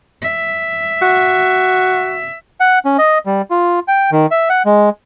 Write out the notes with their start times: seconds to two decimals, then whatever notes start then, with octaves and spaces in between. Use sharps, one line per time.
0.22 E5
1.02 F#4
2.60 F#5
2.85 C#4
2.98 D#5
3.26 G3
3.50 F4
3.88 G5
4.12 D#3
4.31 E5
4.49 F#5
4.65 G#3